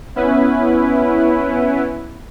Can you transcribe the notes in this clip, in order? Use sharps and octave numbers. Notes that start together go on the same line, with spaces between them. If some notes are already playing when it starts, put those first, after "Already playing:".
B3 C#4 E4 B4